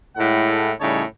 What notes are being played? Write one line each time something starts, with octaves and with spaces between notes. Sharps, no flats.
A2 G#3 F#5
A2 C#3 G3 D#4 C#5 A5